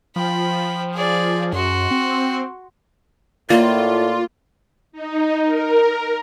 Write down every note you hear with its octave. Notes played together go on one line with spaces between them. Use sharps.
F3 G5 B5
G#4 D5
F#2 F#4 C6
C4
A2 A#3 F4 D5
D#4
A#4